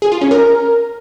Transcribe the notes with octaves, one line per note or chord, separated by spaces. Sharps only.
G#4
F4
C#4
A#4